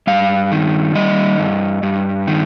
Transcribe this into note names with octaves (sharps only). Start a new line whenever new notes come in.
G2 F5
D#3
G3 D#5
G2
G2
D#3